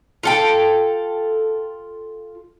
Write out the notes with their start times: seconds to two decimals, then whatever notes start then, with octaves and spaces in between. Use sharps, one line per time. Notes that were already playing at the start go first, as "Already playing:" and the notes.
0.23 F4 A4 G5